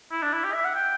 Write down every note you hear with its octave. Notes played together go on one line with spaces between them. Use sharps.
E4
D4
E4
G4
E5
F#5
G5